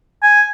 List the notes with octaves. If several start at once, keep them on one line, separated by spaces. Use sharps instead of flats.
G#5